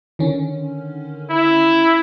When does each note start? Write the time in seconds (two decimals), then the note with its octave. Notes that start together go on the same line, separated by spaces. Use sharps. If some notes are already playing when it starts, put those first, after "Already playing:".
0.19 D3 D#3 C#4
1.30 E4